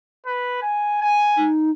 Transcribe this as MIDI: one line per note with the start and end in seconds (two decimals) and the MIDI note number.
0.26 0.57 71
0.62 1.00 80
1.02 1.48 80
1.37 1.71 63